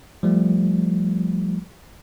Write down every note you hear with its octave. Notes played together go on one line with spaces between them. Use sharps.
F3 G3 A3